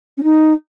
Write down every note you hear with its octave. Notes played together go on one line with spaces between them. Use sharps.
C#4
D#4